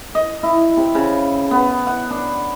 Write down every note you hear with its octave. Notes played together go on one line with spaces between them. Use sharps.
D#5
E4
C3
C#3
B3
F#5
D4